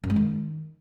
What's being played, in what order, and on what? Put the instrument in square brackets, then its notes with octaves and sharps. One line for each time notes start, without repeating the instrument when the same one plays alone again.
[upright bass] F#2
G#3
D#3